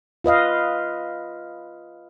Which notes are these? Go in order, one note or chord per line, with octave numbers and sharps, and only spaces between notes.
F4 B4 D#5 F5